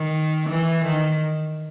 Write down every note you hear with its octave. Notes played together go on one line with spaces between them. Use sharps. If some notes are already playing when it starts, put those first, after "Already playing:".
Already playing: D#3
E3
D#3